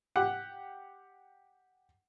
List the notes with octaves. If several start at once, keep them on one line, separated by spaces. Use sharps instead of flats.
G4 F#5 D6